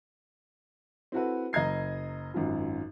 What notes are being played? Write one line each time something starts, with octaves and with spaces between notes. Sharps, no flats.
C4 E4 F#4 A4 B4
F#1 D#5 A#5 G#6 C7
G#1 F#2 F4